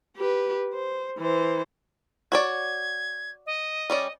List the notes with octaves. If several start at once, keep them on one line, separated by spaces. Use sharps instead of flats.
G4 B4
C5
E3 C5
F#4 C#5 D5 G#6
D#5
G3 C#4 D5